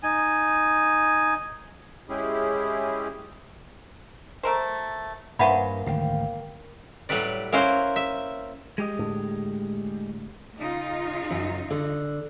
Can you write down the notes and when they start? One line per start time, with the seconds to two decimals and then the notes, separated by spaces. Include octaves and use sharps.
0.03 D#4 G#5
2.09 G#3 C#4 E4 G4 G#4
4.43 A3 A#4 C5
5.39 G2 A#3 C#4 B4 C5 E5 F#5 B5
5.86 G#1 D2 D3 F5 G5
7.09 A2 F#3 G3 B4 D5
7.52 A#3 C#4 E4 F#4 C5
7.96 E5
8.78 G#3 G4 D#5
8.99 A2 D3
10.57 C#3 D#4 F4
11.31 F#2
11.70 D3